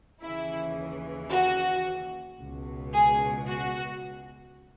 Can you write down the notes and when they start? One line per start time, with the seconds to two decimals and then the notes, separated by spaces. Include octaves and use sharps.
0.22 D#2 C#3 E3 E4
1.30 F#4
2.39 C#2
2.44 B2
2.93 G#4
3.48 F#4